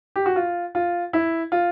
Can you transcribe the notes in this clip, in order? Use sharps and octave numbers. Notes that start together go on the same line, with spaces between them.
G4
F#4
F4
F4
E4
F4